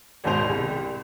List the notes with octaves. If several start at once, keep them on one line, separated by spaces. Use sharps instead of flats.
G#1 D#2 G#2 B2 C5 F7
C2 G4